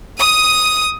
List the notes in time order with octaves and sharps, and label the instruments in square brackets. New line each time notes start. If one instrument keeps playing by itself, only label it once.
[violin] D#6 D#7